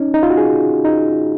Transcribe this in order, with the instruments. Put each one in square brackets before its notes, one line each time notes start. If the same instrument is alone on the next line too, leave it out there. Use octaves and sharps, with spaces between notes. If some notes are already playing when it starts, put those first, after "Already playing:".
Already playing: [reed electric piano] C#4 D#4
D#4
F4
F#4
G#4
D#4